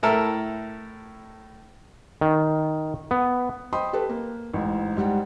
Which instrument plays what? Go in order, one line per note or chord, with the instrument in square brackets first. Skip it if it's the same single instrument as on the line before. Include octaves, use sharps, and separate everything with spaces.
[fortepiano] A2 E4 A4 A#4 A5 E6
[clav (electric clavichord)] D#3
B3
[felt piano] C5 D#5 G5 B5 C6 D#6
G4 A4 B4
A#3
A1 G#2
G#2 G3 F#5 G5